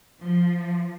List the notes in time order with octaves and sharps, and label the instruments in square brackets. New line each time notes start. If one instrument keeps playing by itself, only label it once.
[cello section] F3